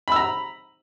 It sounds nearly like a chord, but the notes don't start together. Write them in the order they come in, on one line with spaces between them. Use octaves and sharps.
B5 E6 A#5